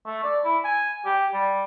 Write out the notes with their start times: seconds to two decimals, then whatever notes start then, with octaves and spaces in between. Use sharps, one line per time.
0.06 A3
0.24 D5
0.44 E4
0.65 G#5
1.05 G4
1.33 G3